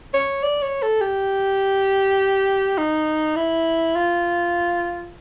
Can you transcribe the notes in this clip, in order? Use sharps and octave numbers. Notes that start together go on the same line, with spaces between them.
C#5
D5
C#5
A4
G4
D#4
E4
F4